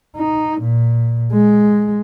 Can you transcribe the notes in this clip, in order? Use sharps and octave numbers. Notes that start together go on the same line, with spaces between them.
D#4
A#2
G#3